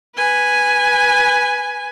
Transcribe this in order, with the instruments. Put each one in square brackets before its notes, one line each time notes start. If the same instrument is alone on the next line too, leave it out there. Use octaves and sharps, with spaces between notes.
[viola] B4 G#5